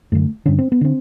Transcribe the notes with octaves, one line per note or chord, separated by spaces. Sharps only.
F#2 D3 A3
G2 D3 C#4
C4
B3
D3 C4